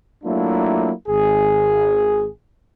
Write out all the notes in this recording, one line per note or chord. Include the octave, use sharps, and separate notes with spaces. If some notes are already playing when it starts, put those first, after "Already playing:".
F#3 A3 A#3 D4 E4 F4
G#1 G#4